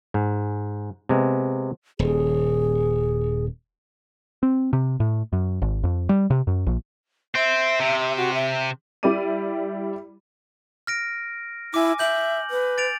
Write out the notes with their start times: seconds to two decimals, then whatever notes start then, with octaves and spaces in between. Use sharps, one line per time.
0.14 G#2
1.09 C3 G#3 B3
1.99 D#1 G#4
4.43 C4
4.73 C3
5.00 A2
5.33 F#2
5.62 G#1
5.83 F2
6.09 G3
6.30 C3
6.47 F#2
6.67 A#1
7.36 C4 E5
7.80 C3
8.17 F#4
8.34 E5
9.03 G3 E4 G4 D5 D6 D#7
10.87 F6 A#6 D7
11.74 E4 G#5 D6
11.99 E5 G6 F#7
12.51 B4
12.78 A6 D7 F7